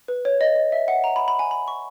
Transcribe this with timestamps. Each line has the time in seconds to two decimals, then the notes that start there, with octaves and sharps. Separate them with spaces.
0.08 B4
0.25 C#5
0.41 D#5
0.56 D#5
0.72 E5
0.88 F#5
1.04 A#5
1.16 B5
1.28 B5
1.39 G#5
1.51 B5
1.68 C#6